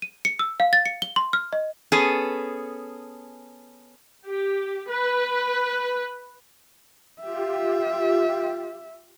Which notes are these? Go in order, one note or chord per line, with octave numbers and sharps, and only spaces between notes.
D#7
C#7
E6
F5
A6
C#7
G7
C6
F6
D#5
B3 C#4 G#4 A4
G4
B4
F4 G4 E5